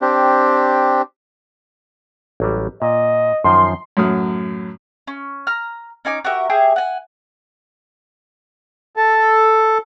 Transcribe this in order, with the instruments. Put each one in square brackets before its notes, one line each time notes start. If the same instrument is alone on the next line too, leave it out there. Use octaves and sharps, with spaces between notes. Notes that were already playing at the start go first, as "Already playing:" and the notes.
[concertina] C4 D4 G4
[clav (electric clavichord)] A1 F#3 G3
[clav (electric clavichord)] A#2 [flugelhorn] D#5
[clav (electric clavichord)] F#2 D#3 F3 [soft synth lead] C6
[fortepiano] F#2 A2 F#3 D#6 F6
[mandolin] C#4
A#5 F6
C#4 D#4 G#5 D6
F#4 G4 A#4 E5
G4 G#4 E5
F#5 G#5
[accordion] A4